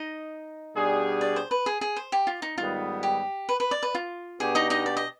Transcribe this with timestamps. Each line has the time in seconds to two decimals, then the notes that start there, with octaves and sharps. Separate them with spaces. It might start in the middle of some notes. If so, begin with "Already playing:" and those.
Already playing: D#4 D#5
0.75 B2 G3 D4 G#4
1.21 D5
1.36 C5
1.51 B4
1.66 G#4
1.81 G#4
1.96 C5
2.12 G4
2.27 F4
2.42 D#4
2.58 G#2 D#3 G3 B3 F4
3.03 G4
3.49 B4
3.60 B4
3.71 D5
3.83 B4
3.95 F4
4.40 B2 B3 D4 G4 G#4
4.55 D#4 D#5
4.70 D#4 D#5
4.86 D5
4.97 D#5